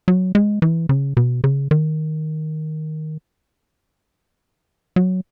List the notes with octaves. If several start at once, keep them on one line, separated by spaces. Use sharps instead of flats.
F#3
G#3
E3
C#3
B2
C#3
D#3
F#3